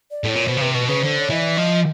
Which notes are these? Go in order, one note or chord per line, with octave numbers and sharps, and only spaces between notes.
D5
A2
C#5
A#2
B2 C5
C#3
C3 B4
B2 B4
C#3 B4
D3 C5
C#5
E3 D#5
D5
F3 D#5